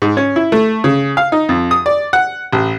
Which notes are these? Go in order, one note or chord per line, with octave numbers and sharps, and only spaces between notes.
G#2
C#4
E4
A3
C#3
F5
D#4
F2
D#6
D5
F#5
A1